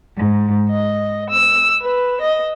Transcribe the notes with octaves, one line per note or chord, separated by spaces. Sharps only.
G#2
D#5
E6
B4
D#5